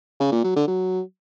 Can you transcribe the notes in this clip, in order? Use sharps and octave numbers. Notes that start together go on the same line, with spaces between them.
C#3
A#2
F#3
D3
F#3